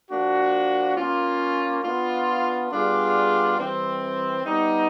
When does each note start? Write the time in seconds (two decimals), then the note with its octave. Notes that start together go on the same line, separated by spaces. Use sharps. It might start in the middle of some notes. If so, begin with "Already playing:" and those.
0.10 F3 A#3 D4 F#4
0.97 A#3 C#4 F4
1.84 B3 D4 F4
2.71 G3 B3 D4 F4 G#4
3.57 E3 G3 C4
4.44 G3 B3 D#4